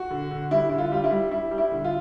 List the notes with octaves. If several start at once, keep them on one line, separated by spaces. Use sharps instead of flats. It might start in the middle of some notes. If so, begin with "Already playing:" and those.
Already playing: F#4
D3
D3
G3 E4
D3 E4
F4
G3 F4
E4
G3
G3 E4
G3
E4
D3
F4